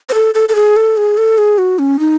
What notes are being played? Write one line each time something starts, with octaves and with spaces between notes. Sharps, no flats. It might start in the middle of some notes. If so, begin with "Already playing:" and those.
C5
A4
A4
A4
G#4
A4
G#4
A4
G#4
F#4
C#4
D#4